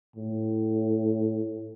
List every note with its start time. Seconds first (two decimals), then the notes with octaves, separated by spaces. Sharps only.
0.16 A2